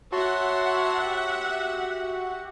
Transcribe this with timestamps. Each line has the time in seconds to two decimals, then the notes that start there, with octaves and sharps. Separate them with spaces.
0.12 F#4 C#5 E5 F#5 A5 C6
1.05 G4